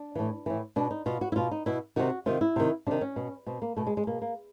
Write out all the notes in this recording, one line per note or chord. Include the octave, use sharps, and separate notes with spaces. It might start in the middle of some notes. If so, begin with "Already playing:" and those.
Already playing: D4
A2 E3
A2 E3
B2 D4
D#4
B2 F4
F#4
E4
B2 F4
D#4
B2 E4
C3 D#3 F#4
C3 D#3 F4
E4
C3 D#3
C3 D#3 D4
C#4
B2
B2 C4
A#3
B2 A3
G#3
G#3
B2 A#3
A#3